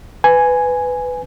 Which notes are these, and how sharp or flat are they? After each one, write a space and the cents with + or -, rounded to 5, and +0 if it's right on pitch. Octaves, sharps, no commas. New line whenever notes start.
B4 +15 G#5 +0